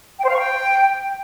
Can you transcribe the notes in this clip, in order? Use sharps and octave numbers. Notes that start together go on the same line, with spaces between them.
G5
C5
F5
C#6
G5